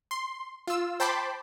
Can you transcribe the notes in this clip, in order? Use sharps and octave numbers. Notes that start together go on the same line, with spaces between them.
C6
F4 E6
C5 G5 A5 B5 C6 D6